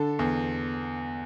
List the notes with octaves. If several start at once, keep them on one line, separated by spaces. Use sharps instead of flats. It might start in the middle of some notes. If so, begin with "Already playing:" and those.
Already playing: D3 A4
E2